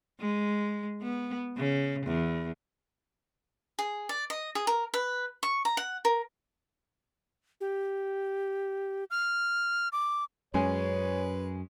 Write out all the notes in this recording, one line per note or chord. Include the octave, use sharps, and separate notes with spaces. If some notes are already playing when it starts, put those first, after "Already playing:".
G#3
B3
C#3
E2
G#4
D5
D#5
G#4
A#4
B4
C#6
A#5
F#5
A#4
G4
F6
D6
F#2 G#3 C#4 G#4 B4 C#5